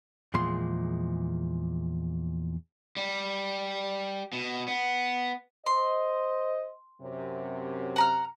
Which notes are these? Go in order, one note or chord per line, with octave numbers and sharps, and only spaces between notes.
E2 A#2 F3 G#3 C6
G3
B2
B3
C5 D#5 C6
F#2 C3
F#5 A#5 F6